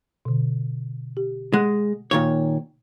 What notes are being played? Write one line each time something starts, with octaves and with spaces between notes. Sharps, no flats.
B2 D3
G4
G#3 F#5 F#6
A#2 D#3 C#5